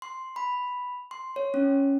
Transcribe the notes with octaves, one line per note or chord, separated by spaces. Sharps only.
C6
B5
C6
C#5
C#4